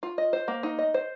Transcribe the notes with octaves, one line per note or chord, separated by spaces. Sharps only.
F4
D#5
C5
A#3
D#4
D#5
C5